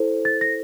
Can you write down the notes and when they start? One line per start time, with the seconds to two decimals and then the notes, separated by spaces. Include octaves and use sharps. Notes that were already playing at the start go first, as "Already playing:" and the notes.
Already playing: E4 A4 C5
0.25 A6
0.41 A#6